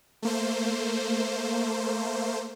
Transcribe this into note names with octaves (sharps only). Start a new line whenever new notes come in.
A3 A#3 C5